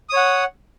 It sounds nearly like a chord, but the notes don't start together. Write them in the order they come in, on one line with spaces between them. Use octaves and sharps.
D#6 C#5 F#5